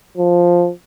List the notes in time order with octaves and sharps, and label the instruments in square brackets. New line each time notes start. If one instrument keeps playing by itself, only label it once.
[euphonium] F3